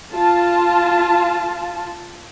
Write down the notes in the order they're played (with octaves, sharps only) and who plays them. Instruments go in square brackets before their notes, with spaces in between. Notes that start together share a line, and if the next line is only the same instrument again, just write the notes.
[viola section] F4 A5